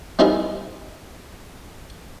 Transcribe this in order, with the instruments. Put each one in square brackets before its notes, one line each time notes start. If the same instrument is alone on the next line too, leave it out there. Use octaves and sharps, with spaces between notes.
[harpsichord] G3 C4 D#4 E4 G#4 A#4